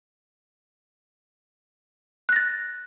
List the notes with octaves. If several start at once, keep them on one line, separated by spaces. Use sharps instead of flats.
F#6 A6 A#6